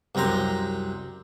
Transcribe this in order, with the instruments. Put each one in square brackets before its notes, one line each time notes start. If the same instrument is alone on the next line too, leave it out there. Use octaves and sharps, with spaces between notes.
[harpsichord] C2 F#2 C4 A#5 C6